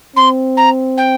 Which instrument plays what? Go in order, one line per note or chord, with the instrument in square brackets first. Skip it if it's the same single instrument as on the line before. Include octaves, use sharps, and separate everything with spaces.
[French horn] C4 [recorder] C6
[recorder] A#5
G5